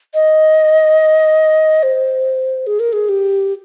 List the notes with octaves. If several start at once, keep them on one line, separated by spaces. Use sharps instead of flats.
D#5
C5
G#4
A#4
G#4
G4